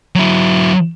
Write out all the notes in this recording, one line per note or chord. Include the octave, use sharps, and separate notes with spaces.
F#3 E4